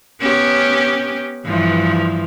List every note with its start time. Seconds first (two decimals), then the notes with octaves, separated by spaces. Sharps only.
0.20 B3 C#4 G4
1.46 G2 E3 F3